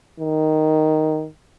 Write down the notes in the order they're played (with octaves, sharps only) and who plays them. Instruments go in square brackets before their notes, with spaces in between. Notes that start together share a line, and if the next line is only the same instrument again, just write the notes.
[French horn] D#3